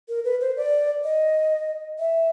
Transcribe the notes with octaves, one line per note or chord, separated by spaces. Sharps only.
A#4
B4
C5
D5
D#5
E5